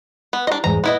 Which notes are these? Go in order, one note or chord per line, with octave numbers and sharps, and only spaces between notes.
B3
D4 E4 G4 D#5 A#5
E2 G#2 G#3 A#5
A#2 B3 E4 B4 D#5